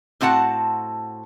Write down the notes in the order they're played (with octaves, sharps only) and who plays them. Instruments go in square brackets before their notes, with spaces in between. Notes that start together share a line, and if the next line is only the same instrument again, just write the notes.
[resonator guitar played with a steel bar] A2 C4 F#4 F#5 A5